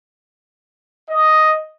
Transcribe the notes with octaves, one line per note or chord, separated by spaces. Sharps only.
D#5